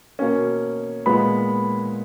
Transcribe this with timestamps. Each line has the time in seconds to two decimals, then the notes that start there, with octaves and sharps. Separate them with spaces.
0.19 B2 A#3 C#4
1.06 A#2 G#3 B3 B5